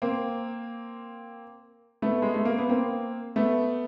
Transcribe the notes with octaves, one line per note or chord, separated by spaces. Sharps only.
A#3 C4
A3 B3
G#3
A3
A#3
B3
A#3 C4
A3 B3